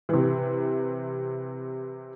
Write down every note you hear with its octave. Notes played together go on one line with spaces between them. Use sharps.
C3 E3